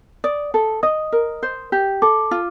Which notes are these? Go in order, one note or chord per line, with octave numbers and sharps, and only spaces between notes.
D5 D#6
A4
D#5 D#6
A#4
C5
G4
A4 D6
F4